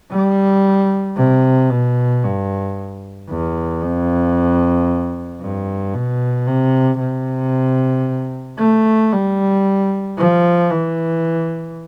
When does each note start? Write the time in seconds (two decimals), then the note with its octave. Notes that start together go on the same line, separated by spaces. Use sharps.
0.12 G3
1.17 C3
1.71 B2
2.24 G2
3.29 E2
3.82 F2
5.41 G2
5.94 B2
6.47 C3
7.00 C3
8.59 A3
9.12 G3
10.18 F3
10.71 E3